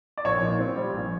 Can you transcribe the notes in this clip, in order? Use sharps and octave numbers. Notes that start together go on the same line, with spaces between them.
D5
A#1 C#5
A#2
C4
G3
A#1